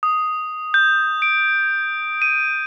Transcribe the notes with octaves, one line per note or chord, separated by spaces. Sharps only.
D#6
G6
D7
D#7